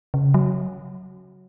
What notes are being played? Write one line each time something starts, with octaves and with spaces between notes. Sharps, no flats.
C#3
F#3